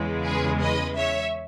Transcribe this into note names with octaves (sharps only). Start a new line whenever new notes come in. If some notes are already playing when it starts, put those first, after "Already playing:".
Already playing: E2 C#3 G#3
G#4 B4
B4 D#5
C#5 E5